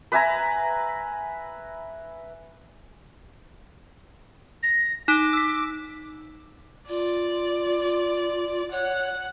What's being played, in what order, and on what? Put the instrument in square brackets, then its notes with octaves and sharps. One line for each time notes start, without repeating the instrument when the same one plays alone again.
[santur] B4 E5 G#5 A#5
[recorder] A#6
[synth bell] D#4 [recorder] D6
[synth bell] E6 B6
[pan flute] F4 [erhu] D5
[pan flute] C#5 [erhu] F#5